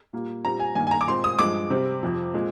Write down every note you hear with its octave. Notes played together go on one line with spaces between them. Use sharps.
A#2 G3 A#3
A#2 G3 C4 A#5
G#5
G2 D#3 A#3 G#5
G#5
A#5
D6
A#2 G#3 C4 C6
D#6
G2 F3 G#3 D6
C3 G3 C4
F2 C3 F3
A#2 G#3 C4